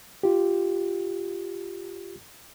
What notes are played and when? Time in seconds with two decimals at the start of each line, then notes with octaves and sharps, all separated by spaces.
0.23 F4 G4